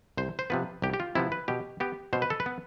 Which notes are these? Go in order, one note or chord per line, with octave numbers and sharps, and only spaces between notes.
C2 C5
C5
C3 F3 B3 B4
C2 G4
G4
F4
C3 F3 B3 E4
B4
B2 G4
B3 G4
B2 C5
B4
A4
B4
B3